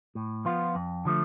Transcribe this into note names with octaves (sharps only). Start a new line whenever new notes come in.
A2
F3 B3 F4
F2
D3 F3 A3